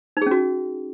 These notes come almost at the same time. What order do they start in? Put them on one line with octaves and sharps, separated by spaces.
D#4 G#4 C#4 F#4